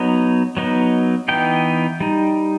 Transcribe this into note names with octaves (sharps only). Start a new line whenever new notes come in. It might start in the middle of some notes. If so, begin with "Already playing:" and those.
Already playing: F#3 B3 D#4
F#3 B3 D#4
E3 B3 D#4 G5
G3 D#4